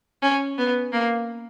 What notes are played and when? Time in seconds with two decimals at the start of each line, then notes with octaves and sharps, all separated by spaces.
0.22 C#4
0.58 B3
0.92 A#3